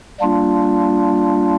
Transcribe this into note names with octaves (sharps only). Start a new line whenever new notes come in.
G3 A#3 D4 F4